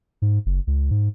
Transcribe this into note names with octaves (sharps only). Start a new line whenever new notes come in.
G#2
F#1
C#2
G#2